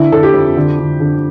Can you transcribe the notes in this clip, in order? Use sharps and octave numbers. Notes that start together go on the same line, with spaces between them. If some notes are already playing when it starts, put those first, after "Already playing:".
Already playing: D3 E4
D3 A4
G4
F2
D3
D3
D3